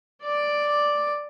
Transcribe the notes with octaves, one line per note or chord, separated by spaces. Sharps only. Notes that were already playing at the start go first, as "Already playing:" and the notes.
D5 D6